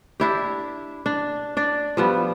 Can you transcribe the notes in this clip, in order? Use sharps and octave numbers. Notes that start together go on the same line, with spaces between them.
D4 E4 G4
D4
D4 D5
F3 G3 B3